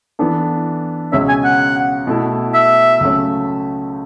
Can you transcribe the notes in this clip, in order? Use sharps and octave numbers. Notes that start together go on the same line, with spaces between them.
E3 B3 D4 A4
C#2 B2 G#3 C#4 G#4 E5
G#5
F#5
B2 A3 E4
E5
C#2 C#3 F#3 A3 C#4